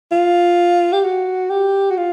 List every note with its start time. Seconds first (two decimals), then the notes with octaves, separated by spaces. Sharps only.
0.12 F4
0.93 G4
1.04 F#4
1.50 G4
1.91 F#4
1.97 F4